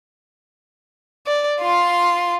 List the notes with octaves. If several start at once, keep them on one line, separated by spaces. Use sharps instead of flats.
D5
F4 C6